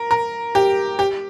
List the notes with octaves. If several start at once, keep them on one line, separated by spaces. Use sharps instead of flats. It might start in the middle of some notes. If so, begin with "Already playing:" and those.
Already playing: A#4
A#4
G4
G4